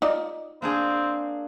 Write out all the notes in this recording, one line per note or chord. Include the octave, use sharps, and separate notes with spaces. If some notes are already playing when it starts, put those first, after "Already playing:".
D#4 F4 D5
A#3 C4 D4 G#4